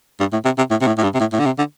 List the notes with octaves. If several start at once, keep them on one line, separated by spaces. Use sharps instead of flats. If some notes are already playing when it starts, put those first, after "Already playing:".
G2
A2
C3
C3
A2
C3
A2
A2
G2
C3
A2
A2
D3
C3
D3